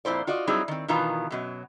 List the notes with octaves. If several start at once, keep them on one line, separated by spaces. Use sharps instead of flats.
F2 A#2 E4 C5 D5
F4 F#4 D5 D#5
F#3 G3 C4 D#4 E4 G#4
D#3 C4
B2 D#3 E3 B3 F4 A#5
F#2 B2 F#3